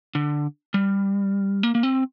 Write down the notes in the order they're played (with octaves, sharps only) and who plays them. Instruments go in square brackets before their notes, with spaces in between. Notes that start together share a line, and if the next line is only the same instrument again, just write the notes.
[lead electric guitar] D3
G3
A#3
A#3
C4